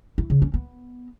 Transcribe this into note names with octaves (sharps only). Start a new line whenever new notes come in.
E4
C#3
C#4
B3